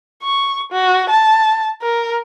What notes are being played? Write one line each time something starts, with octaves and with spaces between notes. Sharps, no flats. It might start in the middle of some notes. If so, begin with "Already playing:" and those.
C#6
F#4
A5
A#4